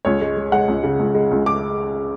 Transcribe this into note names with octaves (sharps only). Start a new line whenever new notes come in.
C#2 C#5
G#3
G#3
G#3 F#5
C#2
C#3
C#2
G#3
C#2
G#3 D6